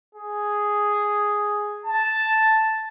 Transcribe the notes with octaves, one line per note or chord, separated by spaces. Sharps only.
G#4
A5